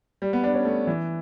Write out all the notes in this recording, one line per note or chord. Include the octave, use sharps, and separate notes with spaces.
G3
B3
D4
C#4
A3
E3